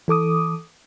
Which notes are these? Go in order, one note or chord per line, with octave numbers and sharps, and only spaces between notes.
E3 A4 D6 D#6